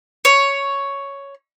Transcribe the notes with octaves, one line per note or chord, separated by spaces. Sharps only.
C#5